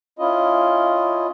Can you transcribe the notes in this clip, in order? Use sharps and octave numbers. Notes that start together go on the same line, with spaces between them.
C#4 E4 F4 D#5